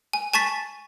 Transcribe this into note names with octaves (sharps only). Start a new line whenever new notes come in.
G#5
G#5 A5 C#6 A6 B6